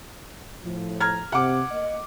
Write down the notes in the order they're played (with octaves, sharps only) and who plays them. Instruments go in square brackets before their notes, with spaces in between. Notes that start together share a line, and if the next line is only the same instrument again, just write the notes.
[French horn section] A2 F3
[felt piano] A#5 F6 G#6
[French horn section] C3 [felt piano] F#5 D6
[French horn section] A#3 D#5